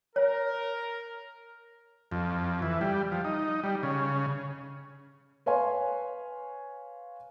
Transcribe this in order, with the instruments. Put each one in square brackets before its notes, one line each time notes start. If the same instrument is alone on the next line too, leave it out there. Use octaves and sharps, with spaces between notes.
[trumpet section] A#4 [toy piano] C#5
[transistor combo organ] F2
E3
G3
F3
D#4
G3
C#3
[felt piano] B4 C#5 F5 G#5 C6